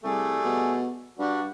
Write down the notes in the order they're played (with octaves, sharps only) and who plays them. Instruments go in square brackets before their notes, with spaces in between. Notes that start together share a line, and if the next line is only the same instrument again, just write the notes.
[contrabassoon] C2 [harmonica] G3 A3 G#4
[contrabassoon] B2
[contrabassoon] G2 [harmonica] G3 D4 F#4